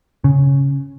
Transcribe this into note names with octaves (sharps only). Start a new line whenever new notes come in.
C#3